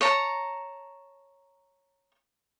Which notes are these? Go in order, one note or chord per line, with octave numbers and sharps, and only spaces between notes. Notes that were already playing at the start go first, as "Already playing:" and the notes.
C#5 A5 A#5